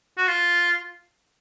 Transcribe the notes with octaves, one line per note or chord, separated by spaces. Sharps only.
F#4
F4